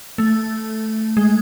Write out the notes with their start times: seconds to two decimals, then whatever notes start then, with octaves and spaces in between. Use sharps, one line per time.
0.18 A3
1.17 G#3